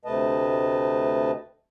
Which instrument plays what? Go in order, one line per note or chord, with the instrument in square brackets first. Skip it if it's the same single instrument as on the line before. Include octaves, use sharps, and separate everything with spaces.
[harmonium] D2 C3 A3 B4 D#5 A5